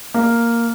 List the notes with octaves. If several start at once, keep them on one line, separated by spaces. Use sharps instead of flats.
A#3